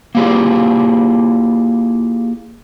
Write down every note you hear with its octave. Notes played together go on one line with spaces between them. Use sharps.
A#3 E4 F4 G4 G#4